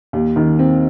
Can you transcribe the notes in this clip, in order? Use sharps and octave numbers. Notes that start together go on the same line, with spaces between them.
D#2
D#3
C4